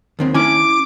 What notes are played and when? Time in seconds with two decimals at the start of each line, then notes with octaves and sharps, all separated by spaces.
0.19 D#2 D#3 C4
0.34 C#4 E4 G#5 D6